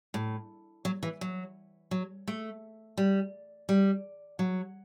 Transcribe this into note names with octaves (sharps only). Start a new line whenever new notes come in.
A2
F#3
E3
F#3
F#3
A3
G3
G3
F#3